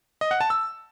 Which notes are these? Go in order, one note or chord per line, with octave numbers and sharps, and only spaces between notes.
D#5
F#5
A5
E6